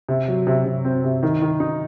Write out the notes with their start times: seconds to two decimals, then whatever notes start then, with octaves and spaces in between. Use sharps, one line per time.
0.09 C3
0.28 F#3
0.47 C3
0.65 C3
0.85 C4
1.04 C3
1.23 D#3
1.42 D#3
1.60 D#4